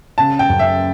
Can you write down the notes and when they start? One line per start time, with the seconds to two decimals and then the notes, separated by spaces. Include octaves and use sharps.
0.18 C#3 A5
0.39 G5
0.49 F#2
0.59 E5